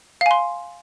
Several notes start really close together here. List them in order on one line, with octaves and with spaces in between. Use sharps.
F5 G#5 C6